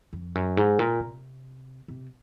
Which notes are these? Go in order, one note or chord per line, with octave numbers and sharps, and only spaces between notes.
F2
F#2
G#2
A#2
C3
C3